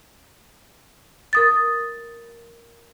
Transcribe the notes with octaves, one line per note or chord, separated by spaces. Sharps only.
A#4 D#6 A6